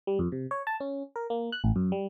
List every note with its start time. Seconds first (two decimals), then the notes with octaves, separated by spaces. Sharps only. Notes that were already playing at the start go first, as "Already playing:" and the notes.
0.07 G3
0.19 F2
0.32 C3
0.51 C#5
0.67 A5
0.80 C#4
1.16 A#4
1.30 A#3
1.52 F#6
1.64 A1
1.76 F#2
1.92 G3